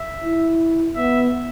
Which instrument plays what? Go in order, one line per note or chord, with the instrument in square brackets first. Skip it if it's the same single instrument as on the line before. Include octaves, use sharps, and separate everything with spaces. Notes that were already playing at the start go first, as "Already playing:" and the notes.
Already playing: [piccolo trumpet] E5
[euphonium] E4
[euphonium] B3 [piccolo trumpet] E5